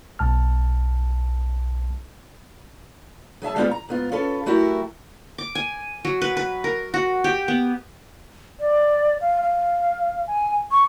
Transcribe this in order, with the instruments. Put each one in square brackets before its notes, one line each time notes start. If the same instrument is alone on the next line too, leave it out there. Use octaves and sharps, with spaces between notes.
[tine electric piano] B1 A5 F6
[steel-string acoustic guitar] F#3 G#4 E5 A5
G3 G#3 B3 C4 D#4 F4
A#5
G#2 B3 F4
C#4 F4 A4 B4
F#3 A3 E4 F#4 G4 A#4
[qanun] D6
G#5
F#3
B4
B4
A#4
F#4
G4
B3
[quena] D5
F5
F5
G#5
C#6